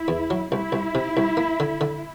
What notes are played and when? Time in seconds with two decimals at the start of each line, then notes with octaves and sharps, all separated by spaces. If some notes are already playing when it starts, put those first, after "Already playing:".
Already playing: E4
0.08 E2
0.30 F#3
0.51 C2 E4
0.72 C2
0.95 C3
1.17 C2
1.37 A#3
1.60 D3
1.81 D3